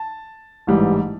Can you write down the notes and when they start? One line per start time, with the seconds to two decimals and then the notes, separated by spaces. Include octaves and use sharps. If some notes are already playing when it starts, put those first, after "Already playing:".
Already playing: A5
0.67 A1 G#2 E3 G3